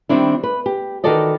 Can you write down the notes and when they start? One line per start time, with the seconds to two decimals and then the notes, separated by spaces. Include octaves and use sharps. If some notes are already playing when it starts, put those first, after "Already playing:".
0.09 D#3 G3 A#3 C4 D4 E4
0.43 B4
0.66 G4
1.04 D#3 E3 F#4 A4 D5 D#5